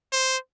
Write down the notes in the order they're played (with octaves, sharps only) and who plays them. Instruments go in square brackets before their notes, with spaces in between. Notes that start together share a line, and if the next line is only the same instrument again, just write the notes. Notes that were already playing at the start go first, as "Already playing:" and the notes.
[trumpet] C5